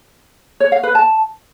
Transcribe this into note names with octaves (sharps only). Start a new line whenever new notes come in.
C#5
F5
B4
A5